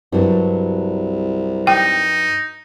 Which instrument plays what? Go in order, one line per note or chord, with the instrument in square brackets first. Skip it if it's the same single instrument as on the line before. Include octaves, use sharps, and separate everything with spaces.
[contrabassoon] C2 [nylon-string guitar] G2 F#3
[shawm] D#4 [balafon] G5